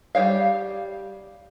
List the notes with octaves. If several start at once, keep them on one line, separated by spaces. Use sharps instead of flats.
G3 G4 C#5 F5